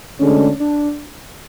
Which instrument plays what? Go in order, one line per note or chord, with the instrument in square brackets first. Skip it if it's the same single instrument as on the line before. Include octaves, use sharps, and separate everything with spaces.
[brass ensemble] D2 D3 G#3 D4 [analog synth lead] C#4
[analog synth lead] D4